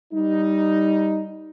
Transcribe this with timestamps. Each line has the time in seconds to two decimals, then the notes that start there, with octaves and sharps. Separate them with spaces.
0.13 G3 D#4